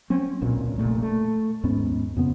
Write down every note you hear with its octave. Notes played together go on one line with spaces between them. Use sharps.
F#3 C4 C#4
D1 B1 A#2 C#4
F1 D#2 A#2 A3
A3
D#2 G#2 B3 C#4
F2 C#3 B3 C4